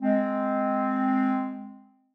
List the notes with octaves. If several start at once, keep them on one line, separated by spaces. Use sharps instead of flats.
G#3 C4